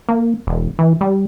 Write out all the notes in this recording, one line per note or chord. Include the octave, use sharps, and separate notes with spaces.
A#3
E1
E3
G3